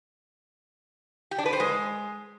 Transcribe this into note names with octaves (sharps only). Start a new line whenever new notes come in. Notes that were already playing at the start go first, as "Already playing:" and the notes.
G4
D4
B4
C5
G#3